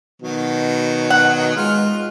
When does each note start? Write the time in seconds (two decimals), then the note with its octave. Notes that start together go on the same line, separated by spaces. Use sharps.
0.22 B2 D#3 F#3
1.10 F#5
1.57 G#3 F4 F6